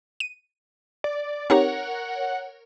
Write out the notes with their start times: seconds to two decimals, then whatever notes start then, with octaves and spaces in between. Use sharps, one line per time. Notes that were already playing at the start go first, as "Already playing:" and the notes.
0.20 D#7
1.04 D5
1.50 C4 D#4 G4 A#4 C#5 F#5